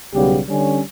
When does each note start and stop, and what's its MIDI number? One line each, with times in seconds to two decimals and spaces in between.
0.14 0.40 35
0.14 0.40 49
0.14 0.40 55
0.14 0.40 59
0.14 0.40 67
0.49 0.80 50
0.49 0.80 55
0.49 0.80 61